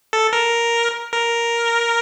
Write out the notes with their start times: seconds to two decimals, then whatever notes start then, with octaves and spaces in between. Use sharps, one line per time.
0.13 A4
0.33 A#4
1.13 A#4